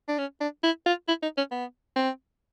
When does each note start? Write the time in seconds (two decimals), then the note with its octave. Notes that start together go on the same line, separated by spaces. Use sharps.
0.08 D4
0.18 C#4
0.41 D4
0.63 E4
0.86 F4
1.08 E4
1.22 D#4
1.37 C#4
1.51 B3
1.96 C4